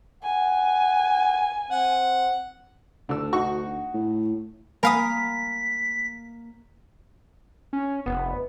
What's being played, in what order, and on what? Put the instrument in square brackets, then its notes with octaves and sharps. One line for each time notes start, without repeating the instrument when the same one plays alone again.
[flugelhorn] F#5 [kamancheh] G#5
[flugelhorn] C4 [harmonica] F#5
[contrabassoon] D2 [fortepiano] D3 E6
[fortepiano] D#4 F#4 C#6
[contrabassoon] A2
[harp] A#3 [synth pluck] A#4 F5 D#6 [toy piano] F#5 G#5 B5 [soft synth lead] B6
[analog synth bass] C#4
[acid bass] F1 [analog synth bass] B3